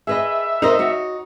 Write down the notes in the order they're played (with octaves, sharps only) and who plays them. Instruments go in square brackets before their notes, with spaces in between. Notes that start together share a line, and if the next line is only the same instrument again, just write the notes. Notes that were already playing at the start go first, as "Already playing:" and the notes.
[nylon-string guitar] G#4 B4 D#5 [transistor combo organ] E5
[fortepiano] D#4 [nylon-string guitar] A#4 C5 D#5
[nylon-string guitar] F#4 C#5